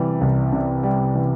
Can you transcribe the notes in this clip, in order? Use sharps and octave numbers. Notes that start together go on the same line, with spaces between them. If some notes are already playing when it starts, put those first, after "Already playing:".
Already playing: C3 E3 G3
C2
C3
G3
E3